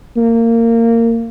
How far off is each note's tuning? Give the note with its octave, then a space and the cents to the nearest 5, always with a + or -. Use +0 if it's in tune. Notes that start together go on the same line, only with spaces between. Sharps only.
A#3 -20